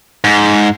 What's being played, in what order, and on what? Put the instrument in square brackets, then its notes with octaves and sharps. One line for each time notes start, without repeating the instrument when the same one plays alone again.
[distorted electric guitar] G#2